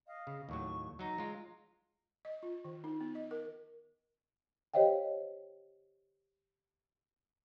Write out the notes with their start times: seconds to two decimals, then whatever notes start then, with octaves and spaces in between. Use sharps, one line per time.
0.06 D#5 F5
0.27 C#3
0.49 D#2 A2 F#3 C#6
0.99 F#3 D#4 A#5
1.18 G#3 F4
2.25 D#5
2.43 F4
2.65 D#3
2.84 D#4
3.01 B3
3.15 D#5
3.31 A#4
4.74 G4 C5 C#5 D#5 F5 G5